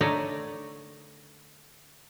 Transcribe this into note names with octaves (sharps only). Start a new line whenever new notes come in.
D3 A3 D#4 A#4 C#5 D5